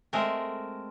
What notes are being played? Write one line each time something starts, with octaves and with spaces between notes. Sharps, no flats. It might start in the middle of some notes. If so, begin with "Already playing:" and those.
G#3 A3 C4 A#4